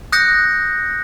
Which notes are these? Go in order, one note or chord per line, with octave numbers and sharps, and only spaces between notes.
D#6 F#6 G6 A#6 C#7